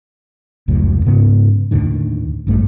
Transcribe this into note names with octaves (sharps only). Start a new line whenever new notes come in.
F1 C#2 F#2 A2
G#2 C#3 B3
D#2 A2 D3 D#3
A#1 G2 A3